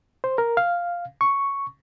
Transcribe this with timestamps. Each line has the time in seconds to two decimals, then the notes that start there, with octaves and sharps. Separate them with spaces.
0.24 C5
0.38 A#4
0.57 F5
1.21 C#6